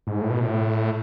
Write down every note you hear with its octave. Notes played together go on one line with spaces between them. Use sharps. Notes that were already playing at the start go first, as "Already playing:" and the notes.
G#2
A2
B2
A2